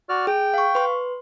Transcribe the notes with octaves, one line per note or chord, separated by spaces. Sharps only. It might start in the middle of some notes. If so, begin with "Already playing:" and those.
F#4 D5 F6
G#4 G5
F5 C#6
B4 C6